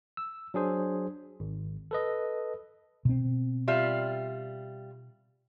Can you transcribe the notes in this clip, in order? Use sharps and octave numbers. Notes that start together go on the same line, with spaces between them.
E6
F#3 D4 G#4 C5
G#1
A4 B4 D#5
B2 C4
G3 F4 E5